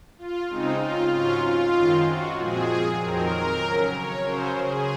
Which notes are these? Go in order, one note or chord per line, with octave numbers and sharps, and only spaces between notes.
F4
C#3 G#3 C4 D#4
F4
G#2 F#3 C#4 F4
F4
F#2 D#3 G#3 C4
F#4
A#2 F3 G#3 C4 G#4
F2 D#3 F#3 C4 A#4
C#3 F#3 C#4
C#5
C#3 F#3 C#4 C5
G#4